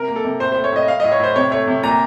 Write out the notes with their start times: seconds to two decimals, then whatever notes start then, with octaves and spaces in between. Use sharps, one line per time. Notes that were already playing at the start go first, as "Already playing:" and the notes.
Already playing: C3 A#4
0.08 A#3
0.16 A4
0.24 C3
0.40 A2 C5
0.52 A3 C5
0.64 C#5
0.72 A2 D#5
0.88 A3 F5
1.00 A2 D#5
1.12 C#5
1.20 A2 C5
1.36 C3 C#5
1.52 A3 C#5
1.68 C3
1.83 A#2 A#5